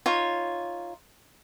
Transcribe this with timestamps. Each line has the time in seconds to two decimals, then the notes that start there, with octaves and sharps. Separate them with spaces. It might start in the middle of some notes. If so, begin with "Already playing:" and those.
0.06 D#4 F4 C#5